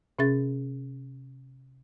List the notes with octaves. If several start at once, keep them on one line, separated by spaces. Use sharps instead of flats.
C3 C#4 G#4 E5 A6